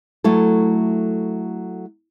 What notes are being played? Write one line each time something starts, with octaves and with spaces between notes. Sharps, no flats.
F#3 A3 E4 A4